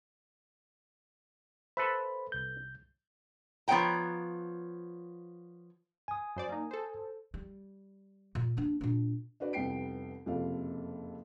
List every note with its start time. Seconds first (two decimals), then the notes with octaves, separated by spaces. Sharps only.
1.77 A4 B4 C5 E5 B5
2.32 C2 G6
3.68 F3 B3 C#5 F#5 G5 A#5
6.08 G#5 D#6
6.36 F#2 C5 D5
6.49 A#3 D#4
6.71 A4 C5
7.34 G3
8.35 A#2
8.57 A#3 D4
8.81 A#2 D4
9.40 D4 F#4 B4 D5
9.53 F1 C2 B3 G5 C7 D7
10.26 F#1 F2 C3 A4 F5